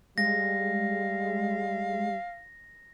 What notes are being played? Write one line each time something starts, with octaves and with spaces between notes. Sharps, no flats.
G3 G#3 F5 A#6